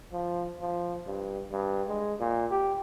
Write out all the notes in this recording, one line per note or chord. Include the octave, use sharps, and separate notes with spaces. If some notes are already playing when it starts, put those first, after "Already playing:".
F3
F3
G2
G2
G#3
A#2
G4